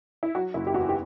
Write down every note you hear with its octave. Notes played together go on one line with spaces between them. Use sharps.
E4
F#3 F#4
F#1 E4
G4
E2 F#4
G4